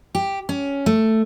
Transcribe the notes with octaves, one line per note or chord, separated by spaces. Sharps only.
G4
C#4
A3